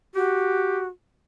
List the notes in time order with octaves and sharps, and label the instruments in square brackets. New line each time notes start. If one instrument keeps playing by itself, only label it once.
[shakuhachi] F#4 [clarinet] G4